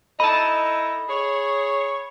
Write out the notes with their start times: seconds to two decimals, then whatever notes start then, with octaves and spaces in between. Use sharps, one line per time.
0.20 D#4 E4 A4 D#5 A5 B5
1.09 G#4 C#5